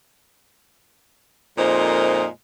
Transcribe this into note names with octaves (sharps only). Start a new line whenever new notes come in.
F2 A#2 G#3 D#4 A#4 C5